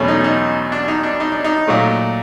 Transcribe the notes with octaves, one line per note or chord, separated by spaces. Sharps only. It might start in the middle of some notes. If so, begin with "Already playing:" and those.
Already playing: E2 B2 F#3 A3 C#4
D#4
D#4
D4
D#4
D4
D#4
D4
D#4
A#2 F#3 A3